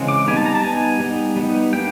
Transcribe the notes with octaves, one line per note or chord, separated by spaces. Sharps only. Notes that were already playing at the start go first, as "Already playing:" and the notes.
Already playing: C#3 E3 G#3 C4
D6
G3 B3 D#4 G#5
A5
A#5
A5
G3 B3 D#4 G#5
G3 B3 D#4
G3 B3 D#4
G3 A#3 D4 G5